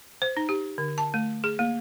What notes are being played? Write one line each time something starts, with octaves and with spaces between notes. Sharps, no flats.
C5
D#4
G4
D3
A5
A3
G#4
A#3